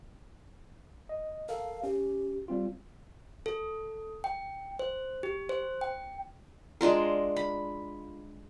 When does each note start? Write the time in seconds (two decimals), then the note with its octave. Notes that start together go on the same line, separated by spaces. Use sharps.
1.09 D#5
1.49 A4 A#4 F5
1.83 C#4 G4
2.48 G3 C4 F4
3.46 A4
4.24 G5
4.79 C5
5.23 G4
5.49 C5
5.81 G5
6.81 G#3 D4 F4 A#4
7.36 B5